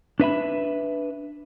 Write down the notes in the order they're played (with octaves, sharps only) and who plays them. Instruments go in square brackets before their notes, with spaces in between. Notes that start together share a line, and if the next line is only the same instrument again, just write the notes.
[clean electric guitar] D4 B4 E5 B5